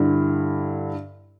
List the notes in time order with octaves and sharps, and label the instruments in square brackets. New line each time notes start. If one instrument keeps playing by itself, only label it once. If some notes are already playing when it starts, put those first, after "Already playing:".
Already playing: [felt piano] G2 D3 E4